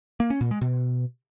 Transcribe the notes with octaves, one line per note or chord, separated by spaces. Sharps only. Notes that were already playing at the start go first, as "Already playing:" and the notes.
A#3
C#4
A#2
G#3
B2